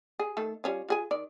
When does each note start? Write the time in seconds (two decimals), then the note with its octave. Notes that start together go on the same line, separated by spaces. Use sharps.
0.19 G#4
0.37 D#3 A3 A4
0.64 G3 C#4 F4
0.89 F4 G#4 G#5
1.11 D#3 D5